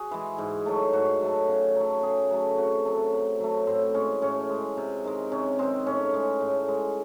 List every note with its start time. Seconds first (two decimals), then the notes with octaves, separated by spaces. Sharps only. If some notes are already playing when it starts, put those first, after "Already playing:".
Already playing: F#4 G#4
0.11 E3 G#3
0.38 G#2
0.66 F#3 A3
0.93 G#2 F#4
1.21 F#3 A3
1.48 C#3
1.76 F#3 A3
2.03 C#3 G#4
2.31 F#3 A3
2.57 C3 F#4
2.85 F#3 A3
3.12 C3
3.40 F#3 A3
3.67 A2 C4
3.94 G#3 C#4
4.22 A2 C#4
4.50 G#3
4.77 C3
5.04 D#3 G#3
5.32 C3 C#4
5.59 D#3 G#3 C4
5.86 A2 C#4
6.14 G#3
6.41 A2
6.68 G#3